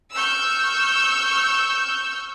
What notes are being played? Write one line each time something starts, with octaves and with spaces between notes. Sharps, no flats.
C#6 E6 F6 G6